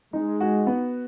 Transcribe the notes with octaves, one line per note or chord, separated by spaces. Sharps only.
G#3 D#4
F#4
B3